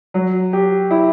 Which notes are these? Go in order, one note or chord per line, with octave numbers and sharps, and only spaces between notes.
F#3
G4
E4